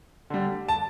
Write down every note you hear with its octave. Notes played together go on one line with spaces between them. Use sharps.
D3 G3
A5